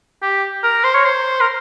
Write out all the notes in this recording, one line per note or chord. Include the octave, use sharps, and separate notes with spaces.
G4
A#4
C5
C#5
C5
A#4